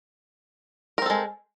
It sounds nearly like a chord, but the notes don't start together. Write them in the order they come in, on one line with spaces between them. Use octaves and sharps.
A#4 C4 A4 G#3